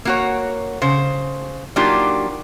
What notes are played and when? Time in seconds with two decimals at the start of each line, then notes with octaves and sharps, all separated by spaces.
0.05 A#3 F#4 C#5
0.82 C#3 C5
1.76 F#3 A#3 D4 D#4 F4 G4